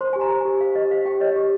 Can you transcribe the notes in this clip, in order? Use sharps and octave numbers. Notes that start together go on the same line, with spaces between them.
C5 C6
G4 G#5
A#5
C5
G4 G#5
C5 F5
G4 D#5
C5 F5
G4 G5
C#5 D#5
G4